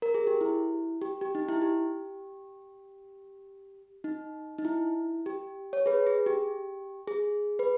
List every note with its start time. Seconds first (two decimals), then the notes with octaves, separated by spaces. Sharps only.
0.02 A#4
0.14 G#4
0.27 G4
0.41 E4
1.02 G4
1.21 G4
1.35 D#4
1.49 E4
1.62 G4
4.04 D#4
4.58 D#4
4.65 E4
5.26 G4
5.73 C#5
5.86 G#4 B4
6.07 G#4
6.26 G4
7.08 G#4
7.59 B4